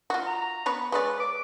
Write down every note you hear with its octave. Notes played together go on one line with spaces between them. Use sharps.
F4 F#4
A#5
B3 B4 C#5
G#3 B4 C#5 D5
D6